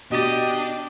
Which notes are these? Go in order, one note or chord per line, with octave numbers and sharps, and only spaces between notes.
B2 D4 F#4 G4 D#5 A6